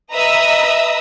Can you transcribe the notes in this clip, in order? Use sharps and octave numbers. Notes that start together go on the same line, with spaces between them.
B4 D#5 E5 A#5 D#6 E6